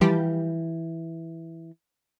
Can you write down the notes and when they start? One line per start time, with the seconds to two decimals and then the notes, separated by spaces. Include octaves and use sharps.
0.01 E3 F3 G3 G4